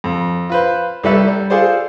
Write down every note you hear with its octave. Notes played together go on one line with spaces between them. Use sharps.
F2
F4 B4 C5
C2 G3 A4 B4 E5
G3
F4 G#4 A4 C5 D5